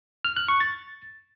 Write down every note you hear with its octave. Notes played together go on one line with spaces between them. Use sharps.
F6
F#6
C#6
A6